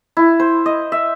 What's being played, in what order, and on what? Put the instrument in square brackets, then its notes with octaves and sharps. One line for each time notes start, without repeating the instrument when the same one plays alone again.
[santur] E4
C5
D#5
E5